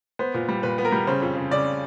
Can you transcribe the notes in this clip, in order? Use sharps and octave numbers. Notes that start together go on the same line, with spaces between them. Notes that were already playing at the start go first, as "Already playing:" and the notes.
B3 C5
A#2
G3
A#2 B4
B3
A#4
G3
C#3 C5
F2
C#3
C#3 D5